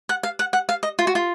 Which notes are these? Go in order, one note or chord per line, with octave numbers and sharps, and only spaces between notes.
F#5
F5
F#5
F#5
F5
D#5
F4
F#4
F4